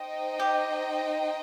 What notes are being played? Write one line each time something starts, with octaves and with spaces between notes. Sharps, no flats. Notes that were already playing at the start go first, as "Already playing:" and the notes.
Already playing: D#4 C5 D#5 G5
G4